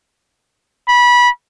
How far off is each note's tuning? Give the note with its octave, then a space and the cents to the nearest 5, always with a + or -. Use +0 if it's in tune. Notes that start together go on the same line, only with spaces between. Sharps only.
B5 -20